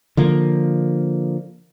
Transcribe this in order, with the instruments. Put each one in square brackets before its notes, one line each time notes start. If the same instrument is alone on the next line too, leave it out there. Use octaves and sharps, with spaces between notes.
[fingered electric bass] D3 F3 A#3